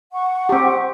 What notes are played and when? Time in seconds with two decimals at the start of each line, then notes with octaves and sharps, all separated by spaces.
0.13 F#5 C#6
0.49 C4 G4